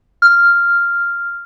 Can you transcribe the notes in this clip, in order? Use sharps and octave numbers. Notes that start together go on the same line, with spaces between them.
F6